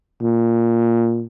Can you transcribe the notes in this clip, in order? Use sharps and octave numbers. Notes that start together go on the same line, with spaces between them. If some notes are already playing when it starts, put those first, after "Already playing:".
A#2